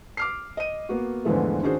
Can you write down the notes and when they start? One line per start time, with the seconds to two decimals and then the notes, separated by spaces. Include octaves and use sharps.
0.17 D6 F6 C7
0.57 D#5 D#7
0.89 A#3 B3 F#4
1.25 E2 G#2 D3 E3 F3 A3
1.63 D#3 C#4 D4 F#4 G#4 C5